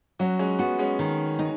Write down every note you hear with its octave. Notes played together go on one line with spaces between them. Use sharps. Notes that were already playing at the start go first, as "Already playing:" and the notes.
F#3 C#4 F#4
G#3 C#4
B3 F#4
G#3 C#4
D#3
D#4